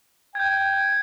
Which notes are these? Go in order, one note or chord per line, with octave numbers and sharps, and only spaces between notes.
G5 G6 G#6